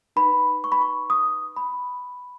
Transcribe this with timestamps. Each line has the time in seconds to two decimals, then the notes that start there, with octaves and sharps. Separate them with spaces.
0.16 D#4 B4 B5
0.64 C#6
0.72 B5
0.81 C#6
1.10 D#6
1.56 B5